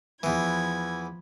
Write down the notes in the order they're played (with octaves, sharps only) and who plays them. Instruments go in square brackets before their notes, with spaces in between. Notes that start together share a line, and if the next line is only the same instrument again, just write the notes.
[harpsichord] E2 E3 [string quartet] F3 B5 G#6